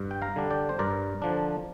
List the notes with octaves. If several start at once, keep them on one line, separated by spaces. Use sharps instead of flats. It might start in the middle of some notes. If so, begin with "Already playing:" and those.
Already playing: G2
G5
F5 A#5
D3 G3 D4
D5 G5
C5
G2 A#4 D5
D3 F3 D4